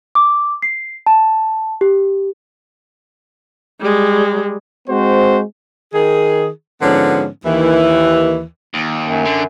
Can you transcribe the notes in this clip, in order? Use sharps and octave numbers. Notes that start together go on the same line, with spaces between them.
D6
C7
A5
G4
G3 G#3
G#3 C4 F#4 C5
D#3 G#4
G#2 D3 F3 B3 C#4
D#2 E3
D#2
F#2
D3